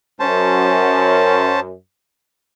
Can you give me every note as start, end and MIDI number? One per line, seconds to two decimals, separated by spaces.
0.20 1.71 42
0.20 1.60 61
0.20 1.60 72
0.20 1.60 81